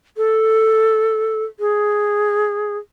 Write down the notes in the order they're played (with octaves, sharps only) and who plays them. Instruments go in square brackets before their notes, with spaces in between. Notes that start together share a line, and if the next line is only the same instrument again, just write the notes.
[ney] A4
G#4